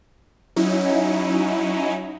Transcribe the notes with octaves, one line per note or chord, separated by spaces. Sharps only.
F#3 C#4 D#4 E4